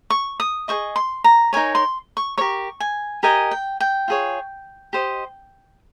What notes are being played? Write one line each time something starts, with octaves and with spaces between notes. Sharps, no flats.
C#6
D#6
G#4 C5 D#5 C#6
C6
A#5
D#4 G4 A#4 C#5 G#5
C6
C#6
G4 A#4 C#5 C#6
G#5
G4 A#4 D#5 G#5
G5
G5
F4 G#4 C#5
G4 C5 D#5